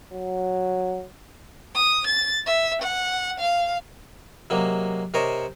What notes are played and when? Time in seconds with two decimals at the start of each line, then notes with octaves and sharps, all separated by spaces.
0.13 F#3
1.75 D#6
2.07 A6
2.46 E5
2.82 F#5
3.40 F5
4.50 C3 F#3 G#3 A#3
5.14 C3 A#4 C5 C#5 D#5